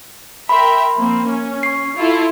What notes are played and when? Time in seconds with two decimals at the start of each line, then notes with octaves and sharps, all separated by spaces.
0.49 A#4 E5 G5 B5 C6
0.96 F3 A#3 C4
1.27 C#4
1.63 C#6 C7
1.96 E4 F4 A4